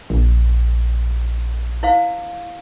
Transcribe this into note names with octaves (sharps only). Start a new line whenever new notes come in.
A#1
E4 C5 F5